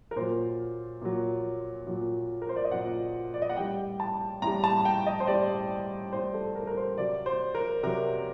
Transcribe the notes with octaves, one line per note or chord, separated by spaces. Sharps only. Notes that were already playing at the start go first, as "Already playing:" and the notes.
A#4
A#2 F#3 C5
A#2 F#3
A#2 F#3
A#4
C5
D5
D#5
A#2 F#3 F#5
D5
D#5
F#5
A2 G3 G5
A5
A2 G3 A#5
A5
G5
D#5
C5
A2 G3 D5
A2 G3 C5
A4
A#4
A#4
C5
C3 F#3 D5
C5
A#4
C3 F#3 A#4